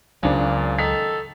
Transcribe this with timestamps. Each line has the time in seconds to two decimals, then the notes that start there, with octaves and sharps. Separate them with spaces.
0.23 C#2 A#2 C#3 F#3 C4 D4
0.79 D#3 A4 B6